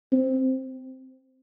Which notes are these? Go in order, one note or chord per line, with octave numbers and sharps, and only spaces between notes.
C4